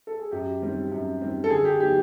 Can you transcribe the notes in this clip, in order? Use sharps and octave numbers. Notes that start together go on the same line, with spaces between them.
A4
G#4
F#2 G4
D#3 G3 C4
F#2
D#3 G3 C4
A4
D3 G#4
G4
F#3 B3 D#4 G4